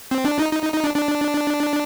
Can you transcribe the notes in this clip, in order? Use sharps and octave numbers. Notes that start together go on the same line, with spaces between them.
C4
D4
D#4
D#4
D#4
D#4
D4
D4